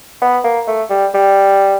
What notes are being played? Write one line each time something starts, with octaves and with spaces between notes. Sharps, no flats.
B3
A#3
A3
G3
G3